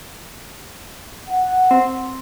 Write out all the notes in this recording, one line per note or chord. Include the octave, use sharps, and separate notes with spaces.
F#5
C4